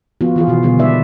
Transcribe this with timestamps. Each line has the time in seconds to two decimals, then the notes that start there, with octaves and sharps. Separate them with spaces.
0.21 F3 B3 F4 F#4
0.36 E3 F4 G#4
0.47 B2 D#3 F#4
0.63 B2 D3 G3 B3 G#4
0.79 G#3 B3 D#4 B4 D5 E5